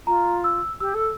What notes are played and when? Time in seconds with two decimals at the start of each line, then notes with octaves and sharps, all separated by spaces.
0.07 F4 A#5
0.44 E6
0.80 G4 E6
0.94 A4